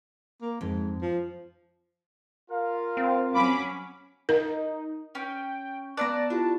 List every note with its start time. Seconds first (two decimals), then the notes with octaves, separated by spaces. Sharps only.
0.42 A#3
0.61 F2 G#2
1.02 F3
2.49 F4 A#4 F5
2.97 C4
3.33 F#3 C#4 B5 D6
4.29 D#4 A#4
5.15 C#4 G5
5.97 B3 D5 E5 A5 A#5 F#6
6.30 D4 E4 F4 G4